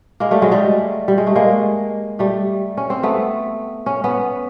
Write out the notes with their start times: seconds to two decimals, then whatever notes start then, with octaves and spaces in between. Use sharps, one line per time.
0.20 G#3 A#3
0.31 G3 A3
0.42 F#3 G#3
0.51 G3 A3
1.08 G3
1.18 G#3
1.27 A3
1.36 G#3 A#3
2.19 G3 A3
2.77 C#4
2.90 C4
3.03 A3 B3
3.86 C#4
4.04 B3 C#4